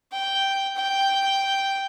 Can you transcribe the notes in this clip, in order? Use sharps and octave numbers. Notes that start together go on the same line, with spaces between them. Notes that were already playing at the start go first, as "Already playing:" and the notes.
G5
G5